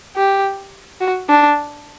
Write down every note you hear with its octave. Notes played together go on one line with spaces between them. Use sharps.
G4
F#4
D4